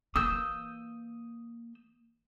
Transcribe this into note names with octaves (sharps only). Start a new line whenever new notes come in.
E3 A#3 D#6 E6 G6